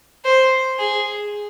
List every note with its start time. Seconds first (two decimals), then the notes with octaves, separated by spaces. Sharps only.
0.25 C5
0.79 G#4